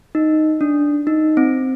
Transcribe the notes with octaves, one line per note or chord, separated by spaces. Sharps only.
D#4
D4
D#4
C4